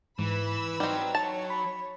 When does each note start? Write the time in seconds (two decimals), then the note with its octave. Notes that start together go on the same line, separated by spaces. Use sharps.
0.19 G#2 E3 B4 B5 E6
0.80 F#3 G3 C4 D#4
1.15 C#5 A5
1.50 B5